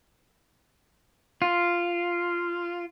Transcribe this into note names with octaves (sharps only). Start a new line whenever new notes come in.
F4